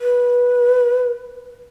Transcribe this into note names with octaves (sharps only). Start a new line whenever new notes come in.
B4